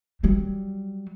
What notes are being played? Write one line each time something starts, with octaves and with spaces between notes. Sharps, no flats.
F#3 G3